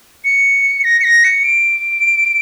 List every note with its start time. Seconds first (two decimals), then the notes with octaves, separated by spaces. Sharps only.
0.25 C#7
0.84 A#6
1.00 C#7
1.04 A#6
1.24 C#7
1.44 D7